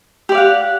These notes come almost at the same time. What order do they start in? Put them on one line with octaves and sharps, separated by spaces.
G4 D5 F5 F#5